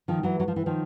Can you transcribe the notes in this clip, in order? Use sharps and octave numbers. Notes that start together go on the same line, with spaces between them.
D#3 F3
E3 F#3
F#3
F3
E3
D#3 F3